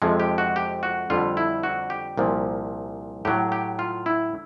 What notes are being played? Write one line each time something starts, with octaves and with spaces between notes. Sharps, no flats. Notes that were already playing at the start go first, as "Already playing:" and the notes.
F2 C3 F3 G#3
G4
F#4
G4
F#4
F2 D3 G3 F4
E4
F#4
G4
C2 A#2 F3
A2 F#3 G4
G4
F4
E4